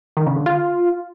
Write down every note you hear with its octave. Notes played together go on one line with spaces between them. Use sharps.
D#3
C#3
D3
F4